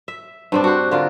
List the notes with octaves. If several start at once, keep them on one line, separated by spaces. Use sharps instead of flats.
E5
G2 C4 D4
F#4 C5
D3 F4 A#4